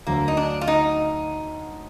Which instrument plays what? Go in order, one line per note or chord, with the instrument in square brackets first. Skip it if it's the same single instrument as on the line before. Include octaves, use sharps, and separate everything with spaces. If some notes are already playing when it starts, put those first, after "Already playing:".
[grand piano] D2 D3 F#3 [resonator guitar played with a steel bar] A#3
[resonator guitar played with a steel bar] D#4
D4
F4
D#4